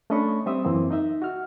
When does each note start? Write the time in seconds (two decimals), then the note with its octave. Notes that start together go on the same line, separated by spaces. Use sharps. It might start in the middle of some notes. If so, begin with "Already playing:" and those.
0.10 A3 C#4 D4 D#5 B5 C#6
0.46 G3 C4 E5 D#6
0.65 F#2 E3 A#3 C4
0.91 D#4 D#5 E5
1.22 F#4 F6